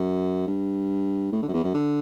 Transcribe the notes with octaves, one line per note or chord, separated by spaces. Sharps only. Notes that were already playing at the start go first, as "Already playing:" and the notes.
Already playing: F#2
G2
A2
D3
F#2
E2
F#2
D3